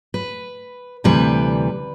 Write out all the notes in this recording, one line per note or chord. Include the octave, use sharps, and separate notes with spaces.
B4
D2 C3 E3 G3 B4